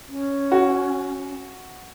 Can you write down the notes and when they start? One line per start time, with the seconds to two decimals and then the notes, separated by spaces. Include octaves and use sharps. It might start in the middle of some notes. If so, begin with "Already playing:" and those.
0.08 C#4
0.52 F#4